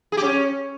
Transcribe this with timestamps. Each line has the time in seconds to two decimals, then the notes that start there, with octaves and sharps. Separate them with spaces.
0.12 G#4
0.17 G4
0.23 C#4